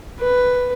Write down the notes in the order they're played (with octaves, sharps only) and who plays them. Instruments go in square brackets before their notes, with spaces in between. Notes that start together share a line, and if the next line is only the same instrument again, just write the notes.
[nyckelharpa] B4